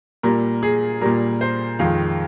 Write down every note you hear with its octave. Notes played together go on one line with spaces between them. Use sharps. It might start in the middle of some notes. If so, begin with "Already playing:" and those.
A#2 G3 A#4
G#4
A#2 G3 A#4
C5
F2 D#3 G#3 F5